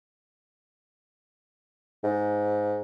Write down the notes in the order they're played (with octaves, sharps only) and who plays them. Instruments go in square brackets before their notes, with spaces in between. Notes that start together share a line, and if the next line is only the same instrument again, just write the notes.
[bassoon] G#2